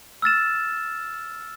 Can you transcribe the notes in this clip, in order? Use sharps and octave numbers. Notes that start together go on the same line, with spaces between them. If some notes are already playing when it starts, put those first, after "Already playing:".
E6 F6 A6 E7